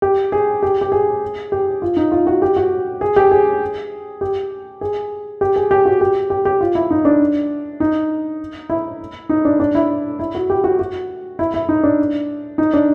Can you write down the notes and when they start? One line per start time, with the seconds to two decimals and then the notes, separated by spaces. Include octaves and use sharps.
0.02 G4
0.32 G#4
0.63 G4
0.81 G4
0.92 G#4
1.52 G4
1.82 F4
1.97 D#4
2.12 F4
2.27 F#4
2.42 G4
2.56 F#4
3.01 G#4
3.16 G4
3.31 G#4
4.21 G4
4.81 G#4
5.41 G4
5.56 G#4
5.71 G4
5.85 F#4
6.01 G4
6.30 G4
6.45 G4
6.61 F4
6.75 E4
6.91 D#4
7.05 D4
7.80 D#4
8.70 E4
9.29 D#4
9.45 D4
9.60 D4
9.75 E4
10.19 E4
10.35 F#4
10.50 G4
10.64 F#4
10.79 F#4
11.39 E4
11.54 E4
11.69 D#4
11.83 D4
12.58 D#4
12.73 D4